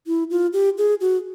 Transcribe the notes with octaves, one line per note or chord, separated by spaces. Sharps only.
E4
F4
G4
G#4
F#4